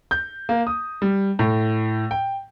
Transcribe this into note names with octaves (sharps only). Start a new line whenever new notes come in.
G6
A#3
D#6
G3
A2
G5